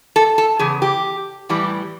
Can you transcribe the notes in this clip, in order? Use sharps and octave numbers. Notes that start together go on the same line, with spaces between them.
A4
A4
E2 C#3 G#4
G4
A2 E3 G3